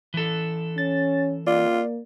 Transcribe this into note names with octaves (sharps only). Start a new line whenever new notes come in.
E3 A4
C#4 A6
A#3 F4 D5